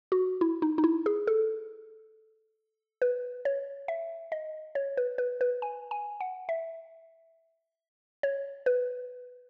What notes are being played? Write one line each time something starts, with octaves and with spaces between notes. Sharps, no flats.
F#4
E4
D#4
D#4
E4
G#4
A4
B4
C#5
E5
D#5
C#5
B4
B4
B4
G#5
G#5
F#5
E5
C#5
B4